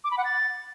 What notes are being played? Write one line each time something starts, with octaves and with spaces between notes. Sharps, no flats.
D6
B5
F#5
A6